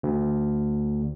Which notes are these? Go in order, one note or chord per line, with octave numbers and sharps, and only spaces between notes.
D2